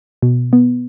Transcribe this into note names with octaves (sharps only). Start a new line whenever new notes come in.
B2
B3